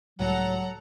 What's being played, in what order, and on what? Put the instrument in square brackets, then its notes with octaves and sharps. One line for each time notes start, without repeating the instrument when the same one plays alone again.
[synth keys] C#2 A2 G3 [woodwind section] F#3 [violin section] A4 F#5 A#5